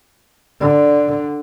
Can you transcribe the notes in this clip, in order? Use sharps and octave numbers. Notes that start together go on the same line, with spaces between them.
D3 D5